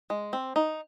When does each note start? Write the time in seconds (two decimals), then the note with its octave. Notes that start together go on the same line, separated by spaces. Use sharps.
0.10 G#3
0.33 C4
0.56 D#4